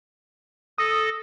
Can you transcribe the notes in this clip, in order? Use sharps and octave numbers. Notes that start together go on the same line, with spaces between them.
A4 D#6 A#6